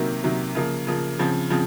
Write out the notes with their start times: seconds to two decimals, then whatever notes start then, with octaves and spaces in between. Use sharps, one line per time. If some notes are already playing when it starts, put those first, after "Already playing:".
Already playing: C3 D#3 F#3 A#3
0.24 C3 D#3 F#3 A#3
0.55 C#3 F3 A#3
0.87 C#3 F3 A#3
1.19 C#3 F3 C4
1.50 C#3 F3 C4